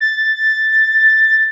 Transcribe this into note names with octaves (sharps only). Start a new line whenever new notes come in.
A6